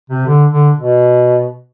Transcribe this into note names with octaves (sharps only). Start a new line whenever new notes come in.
C3
D3
D3
B2